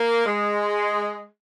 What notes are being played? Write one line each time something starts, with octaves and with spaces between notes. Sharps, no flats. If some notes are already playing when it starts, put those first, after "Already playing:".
Already playing: A#3
G#3